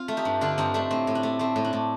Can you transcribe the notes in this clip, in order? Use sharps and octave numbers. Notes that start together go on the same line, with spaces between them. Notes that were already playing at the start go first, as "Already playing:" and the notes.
Already playing: C4 F4
A3
D#4 G4
G2
D3 D4 F4
G2 C4 D#4
A3 D4
A2 C4
A2
D4
A3
A3 C4
A2
D4
A2